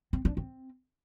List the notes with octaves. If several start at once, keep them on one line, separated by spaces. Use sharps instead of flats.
C4
D4
C4